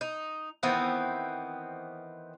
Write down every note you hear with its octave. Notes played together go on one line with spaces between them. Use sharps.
D#4
D#3 E3 B3 C4